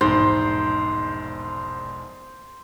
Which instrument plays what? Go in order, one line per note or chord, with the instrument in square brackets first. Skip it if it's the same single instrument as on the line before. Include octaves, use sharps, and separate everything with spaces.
[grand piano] E1 A#1 G#2 [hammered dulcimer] C5